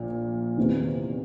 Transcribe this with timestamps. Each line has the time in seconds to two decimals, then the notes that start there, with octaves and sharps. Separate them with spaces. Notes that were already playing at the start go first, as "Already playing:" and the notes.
Already playing: A#1 A#2
0.57 E2 C3 D#3